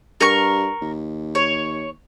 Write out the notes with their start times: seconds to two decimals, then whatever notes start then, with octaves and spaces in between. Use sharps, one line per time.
0.21 G2 A#4 C#6
0.82 D#2
1.35 C#5